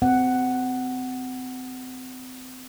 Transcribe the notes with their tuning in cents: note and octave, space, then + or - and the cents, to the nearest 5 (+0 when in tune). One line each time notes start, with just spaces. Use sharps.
C4 -35 F#5 +10